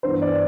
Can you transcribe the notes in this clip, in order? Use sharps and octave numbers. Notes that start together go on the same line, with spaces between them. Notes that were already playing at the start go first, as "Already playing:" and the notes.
G2 E3 B3 D4 C5
D5